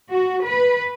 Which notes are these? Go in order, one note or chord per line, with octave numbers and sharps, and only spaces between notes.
F#4
B4